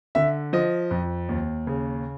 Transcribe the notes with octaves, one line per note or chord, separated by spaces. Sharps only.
D3 E5
F3 D#5
F2
D#2
C#3